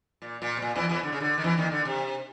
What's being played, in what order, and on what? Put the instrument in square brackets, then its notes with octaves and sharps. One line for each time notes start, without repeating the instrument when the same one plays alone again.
[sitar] A#2
A#2
B2
A#2
E2 E3
E2 E3
D3
C#3
D3
D#3
E2 E3
D#2 D#3
D3
C3